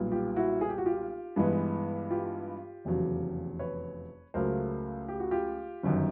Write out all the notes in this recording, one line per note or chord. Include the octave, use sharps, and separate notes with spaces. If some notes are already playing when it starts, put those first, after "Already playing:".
Already playing: B1 A#2 G3 B3
F4 G4
E4 F#4
G#4
G4
F#4
F4 G4
G2 E3 G#3 B3
F4 G4
F1 E2 C#3 F#3
B4 C#5
C#2 C#3 F#3 A3 A#4 C5
G4
F#4
F4 G4
G1 F#2 D#3